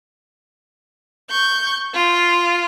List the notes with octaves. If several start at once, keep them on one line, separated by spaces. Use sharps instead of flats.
C#6 G6
F4